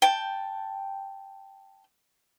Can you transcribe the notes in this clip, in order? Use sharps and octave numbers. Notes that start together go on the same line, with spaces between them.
G5 A5